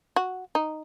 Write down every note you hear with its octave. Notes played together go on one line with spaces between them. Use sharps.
F#4
D#4